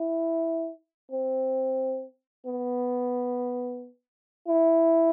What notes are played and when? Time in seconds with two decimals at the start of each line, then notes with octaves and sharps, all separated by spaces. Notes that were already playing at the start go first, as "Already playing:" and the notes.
Already playing: E4
1.11 C4
2.46 B3
4.48 E4